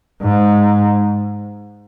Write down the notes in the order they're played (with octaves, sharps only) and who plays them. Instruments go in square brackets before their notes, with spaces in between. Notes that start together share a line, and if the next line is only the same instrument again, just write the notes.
[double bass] G#2